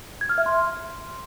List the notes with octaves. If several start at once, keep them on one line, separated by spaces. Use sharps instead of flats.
G#6
F6
E5
C6